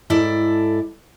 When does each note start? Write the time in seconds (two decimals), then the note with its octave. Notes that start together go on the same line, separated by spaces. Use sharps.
0.10 G#2 E4 A4 D5